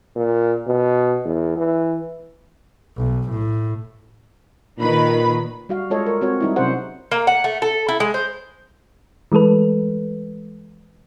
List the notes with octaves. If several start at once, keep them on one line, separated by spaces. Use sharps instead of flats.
A#2
B2
E2
E3
B1
A2
A#2 D#3 B4 B5
G3 F#4 F5
G#3 F4 A4 C#5 D#5
A#4
C4 F#4 C#5
G3 D#4 E4
C3 F#3 C#4 G#4 C5 F#5
A#3
F#5
A3
A4
E4
G#3
C5
E3 G#3 A3 A4 B4